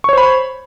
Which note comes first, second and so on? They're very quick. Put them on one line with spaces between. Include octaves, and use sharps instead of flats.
C#6 C#5 C5 B5